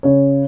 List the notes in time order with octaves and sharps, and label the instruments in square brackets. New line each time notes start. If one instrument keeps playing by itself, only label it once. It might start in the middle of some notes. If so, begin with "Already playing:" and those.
[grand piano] C#3 C#5